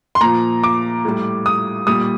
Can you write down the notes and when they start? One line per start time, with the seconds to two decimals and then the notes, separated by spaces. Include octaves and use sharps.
0.15 C6
0.21 A#2 F3 A#5
0.64 D6
1.05 A2 G3
1.46 D#6
1.87 A#2 G3 D#6